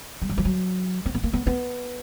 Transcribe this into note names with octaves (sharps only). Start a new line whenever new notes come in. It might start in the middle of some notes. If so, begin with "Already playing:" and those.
G3
F#3
F3
F#3
C4
B3
A#3
B3
B3